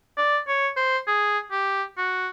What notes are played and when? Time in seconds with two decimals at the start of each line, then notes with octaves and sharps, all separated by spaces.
0.18 D5
0.48 C#5
0.77 C5
1.07 G#4
1.52 G4
1.98 F#4